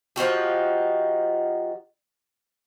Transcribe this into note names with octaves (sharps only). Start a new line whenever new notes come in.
F3 D#4 F#4 G4